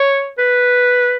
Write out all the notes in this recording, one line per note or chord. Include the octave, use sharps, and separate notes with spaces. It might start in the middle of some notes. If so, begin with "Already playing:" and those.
Already playing: C#5
B4